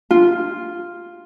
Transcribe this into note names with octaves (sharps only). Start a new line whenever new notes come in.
F4